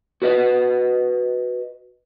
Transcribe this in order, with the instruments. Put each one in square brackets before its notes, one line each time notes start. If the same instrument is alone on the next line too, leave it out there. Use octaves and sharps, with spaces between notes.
[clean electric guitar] F#4 B4 D#5 F#5